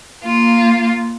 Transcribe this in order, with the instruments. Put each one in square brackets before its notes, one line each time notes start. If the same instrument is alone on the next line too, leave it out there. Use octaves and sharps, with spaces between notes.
[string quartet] A#3 F4